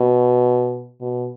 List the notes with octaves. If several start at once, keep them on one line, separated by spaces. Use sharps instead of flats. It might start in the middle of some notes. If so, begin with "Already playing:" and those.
Already playing: B2
B2